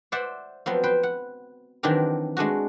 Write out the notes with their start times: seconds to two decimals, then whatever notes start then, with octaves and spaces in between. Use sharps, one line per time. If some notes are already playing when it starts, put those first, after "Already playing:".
0.12 C5 D5 E5 F#5
0.66 F3 F#3 B3 C4
0.84 B4 C5 G5
1.03 F#5
1.83 D#3 E3 F#3 C4 D4 A#4
2.37 G#3 A3 D4 F#4